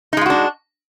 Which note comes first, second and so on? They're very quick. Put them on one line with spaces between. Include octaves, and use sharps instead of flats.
D#4 G#3 F4 F#4 D4